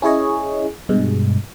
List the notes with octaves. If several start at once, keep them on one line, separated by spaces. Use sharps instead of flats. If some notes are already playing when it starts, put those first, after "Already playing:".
C#4 E4 G#4 C#5 D#5
G2 B2 G#3